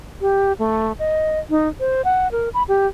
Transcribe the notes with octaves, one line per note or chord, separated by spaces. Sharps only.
G4
A3
D#5
D#4
C5
F#5
A#4
B5
G4